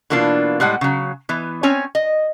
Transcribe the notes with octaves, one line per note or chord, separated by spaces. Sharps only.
B2 E3 A#3 D4 F4
A2 G3 G#3 F#5
C#3 F#3
E3 B3
C4 C#4 C#5 G#5
D#5